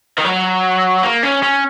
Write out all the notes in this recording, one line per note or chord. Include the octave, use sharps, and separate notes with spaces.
D#3
F#3
A#3
C#4
C#4